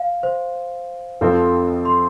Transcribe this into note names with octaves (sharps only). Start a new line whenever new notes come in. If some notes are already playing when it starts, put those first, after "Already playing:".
Already playing: F5
C5
F2 F3 C4 F4 A4
C6